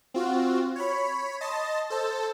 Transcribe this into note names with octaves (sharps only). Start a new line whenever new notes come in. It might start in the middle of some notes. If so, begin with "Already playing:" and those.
C4 F4 F#4
C#5 B5
D#5 A5 C6
A4 C5 A5